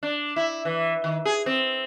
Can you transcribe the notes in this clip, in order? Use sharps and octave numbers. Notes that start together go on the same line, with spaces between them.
D4
E4
E3
D#3
G#4
C4